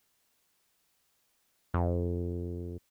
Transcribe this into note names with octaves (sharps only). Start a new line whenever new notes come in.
F2